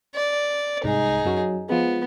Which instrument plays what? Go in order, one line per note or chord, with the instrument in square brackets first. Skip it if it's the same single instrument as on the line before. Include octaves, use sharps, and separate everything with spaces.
[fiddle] D5
[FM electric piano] C2 G#2 [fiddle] D#4 G#4
[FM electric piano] F#2 F#3 C#4
[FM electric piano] F3 G#3 [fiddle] B3